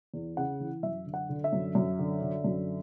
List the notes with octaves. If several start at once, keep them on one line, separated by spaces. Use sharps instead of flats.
E2
C#3 F#5
E3
F#2 E5
D3
F#5
D3
E5
F#2
F#2
D3
D3
F#2